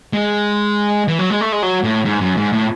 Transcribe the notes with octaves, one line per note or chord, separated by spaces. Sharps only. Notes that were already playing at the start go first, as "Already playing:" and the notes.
G#3
E3
F#3
G#3
A3
G#3
F#3
A2
G#2
F#2
G#2
A2